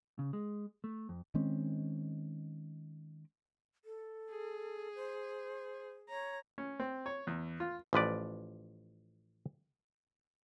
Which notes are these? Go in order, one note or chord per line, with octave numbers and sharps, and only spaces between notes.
C#3
G#3
A3
F2
D#3 G#3 C4 C#4
A4
G#4
C5
C#5 A#5
C#4
C4
C#5
E2
F4
A1 F3 B4 D5